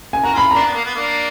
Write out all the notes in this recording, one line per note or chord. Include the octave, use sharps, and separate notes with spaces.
G#5
F#4 A#4 A#5
F4 G#4 B5
A#3 D4 A#5
B3
A#3
B3
A#3 D4